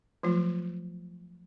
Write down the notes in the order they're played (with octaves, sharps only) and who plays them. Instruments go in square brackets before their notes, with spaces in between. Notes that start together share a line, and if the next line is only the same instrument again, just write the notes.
[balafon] F3 F#3 A3 F4